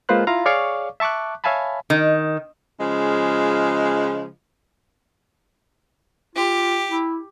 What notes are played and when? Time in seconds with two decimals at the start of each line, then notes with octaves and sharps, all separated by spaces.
0.09 G#3 A#3 F4 B4 C5 F#6
0.27 E4 F4 F5 A#5
0.46 G#4 C#5 D5 F5 C#6 D6
1.00 E5 A5 C#6 D6 F#6
1.44 C#5 E5 F5 G#5 A5 B5
1.90 D#3
2.79 C#3 F3 G#3 F4
6.36 F4 G4
6.90 E4